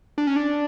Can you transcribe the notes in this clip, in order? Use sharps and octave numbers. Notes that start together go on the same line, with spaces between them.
D4
C#4
D4